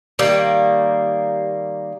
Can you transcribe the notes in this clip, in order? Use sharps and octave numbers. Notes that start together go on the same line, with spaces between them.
D#3 G3 A#3